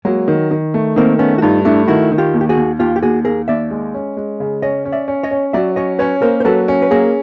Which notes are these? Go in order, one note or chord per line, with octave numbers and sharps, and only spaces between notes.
F#3 G#3 A#3
D#3
D#3
A3
D#3 A#3 C4
A3 B3 C#4
F#4
G2 D#4 F4
A3 D4 E4
D#3 E4 F#4
D#3
F4 G4
D#2
G4
F#4 G#4
D#2
D#2 F4 G4
G4
D#2 F#4 G#4
D#2 G#4 A#4
D#2 D5 E5
G#3
C#4
G#3
C#3
C#4 C#5 D#5
C#4
D5 E5
C#4
C#5 D#5
C#4
F#3 D5 E5
C#4 C#5 D#5
C#4 B4 C#5
A#3 A#4 C5
C5
F#3 A4 B4
C#4
B4
A#3 G#4 A#4